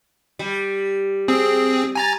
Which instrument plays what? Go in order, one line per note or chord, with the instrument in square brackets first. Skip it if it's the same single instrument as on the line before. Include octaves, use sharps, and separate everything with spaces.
[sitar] G3
[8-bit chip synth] C4 G#4
G#5 A#5 A6